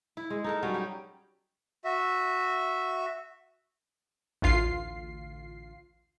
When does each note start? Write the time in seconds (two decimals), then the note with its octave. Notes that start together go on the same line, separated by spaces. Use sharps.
0.17 E4
0.30 G#3
0.44 D#4 A4 A#4
0.63 F#3 G3 C#4
0.74 G4
1.85 F#4 E5
4.42 A1 D2 F4 C7